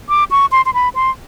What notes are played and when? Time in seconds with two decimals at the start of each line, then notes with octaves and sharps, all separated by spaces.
0.09 D6
0.31 C#6
0.52 C6
0.66 C6
0.74 B5
0.95 C6